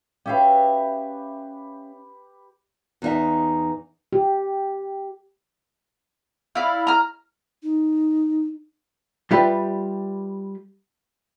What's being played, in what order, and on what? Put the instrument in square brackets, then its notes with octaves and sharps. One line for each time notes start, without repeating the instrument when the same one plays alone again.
[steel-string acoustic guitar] C#4 E5 F5 [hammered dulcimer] G4 B4
[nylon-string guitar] E2 D#4 E5
[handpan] G4
[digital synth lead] E4 [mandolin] D5 F5
[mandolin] A#5 F6
[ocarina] D#4
[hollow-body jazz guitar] G3 F4 G4 B4 D5 E5